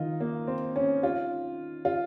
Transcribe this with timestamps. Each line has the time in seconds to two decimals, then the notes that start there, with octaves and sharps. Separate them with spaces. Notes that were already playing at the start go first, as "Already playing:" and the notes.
Already playing: D#3 D#4 F4
0.20 A#3
0.47 C4
0.76 C#4
1.03 F4
1.85 F4